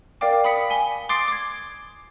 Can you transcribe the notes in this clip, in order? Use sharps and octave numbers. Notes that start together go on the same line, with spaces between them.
A#4 D5 F5 G5 D6
B5 D#6 B6 C#7
G#5 G7
C6 D6 D#6 A6 C7 D7
D6 G#6